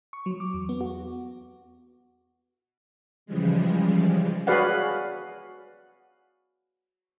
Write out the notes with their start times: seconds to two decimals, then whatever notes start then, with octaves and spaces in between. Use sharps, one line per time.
0.13 C#6
0.26 F#3
0.40 D6
0.54 E2
0.69 B3
0.81 F#4
3.26 C#3 E3 F3 G3 G#3
4.47 F#4 G#4 B4 D5 F5 F#5